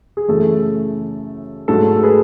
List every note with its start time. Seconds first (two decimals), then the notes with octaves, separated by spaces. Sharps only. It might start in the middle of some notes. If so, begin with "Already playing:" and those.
0.17 G#4
0.28 F#2 C#3 E3 A3 A4
1.68 G#2 F#3 A3 A4
1.96 A4
2.03 G#4 B4